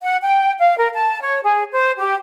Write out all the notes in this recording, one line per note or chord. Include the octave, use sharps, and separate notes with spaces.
F#5
G5
F5
A#4
A5
C#5
G#4
C5
G4